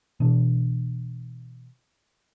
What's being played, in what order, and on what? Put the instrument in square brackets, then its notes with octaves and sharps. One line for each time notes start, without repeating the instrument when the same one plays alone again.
[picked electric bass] B2 E3 D4